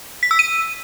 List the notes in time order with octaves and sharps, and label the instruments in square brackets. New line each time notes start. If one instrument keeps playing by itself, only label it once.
[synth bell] B6
E6
D#7